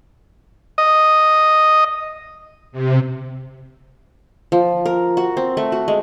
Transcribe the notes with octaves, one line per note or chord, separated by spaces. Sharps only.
D#5
C3
F3
A#4
F#4
C4
A3
F#4
G#3